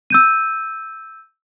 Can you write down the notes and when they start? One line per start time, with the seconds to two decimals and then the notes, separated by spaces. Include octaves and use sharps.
0.10 E6 G6 D#7